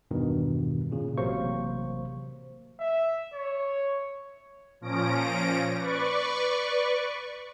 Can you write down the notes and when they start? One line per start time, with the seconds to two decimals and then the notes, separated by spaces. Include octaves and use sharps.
0.11 E2 G2 B2 D#3
0.91 A#2 C#3
1.18 A1 C3 F#3 A#3 C5 C#6
2.80 E5
3.34 C#5
4.81 A#2 F3 C#4 A#6 D7
5.76 B4 D5 C#6